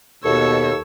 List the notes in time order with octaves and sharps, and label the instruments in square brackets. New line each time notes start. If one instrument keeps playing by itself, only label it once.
[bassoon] D#2 [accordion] B2 [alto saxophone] A4 [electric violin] C#5 E6